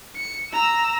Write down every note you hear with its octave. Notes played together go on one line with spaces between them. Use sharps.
C#7
A#5 E6